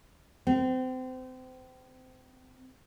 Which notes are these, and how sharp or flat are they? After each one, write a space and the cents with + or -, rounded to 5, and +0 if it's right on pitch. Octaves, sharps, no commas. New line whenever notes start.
C4 -30